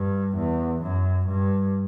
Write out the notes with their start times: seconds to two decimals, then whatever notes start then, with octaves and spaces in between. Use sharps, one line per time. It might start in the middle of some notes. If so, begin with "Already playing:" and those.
Already playing: G2
0.36 E2
0.82 F#2
1.28 G2